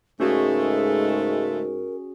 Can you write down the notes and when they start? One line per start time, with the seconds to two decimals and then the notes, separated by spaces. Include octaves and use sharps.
0.20 G#2 C#3 G#3 A3 C#4 F#4 G#4 A#4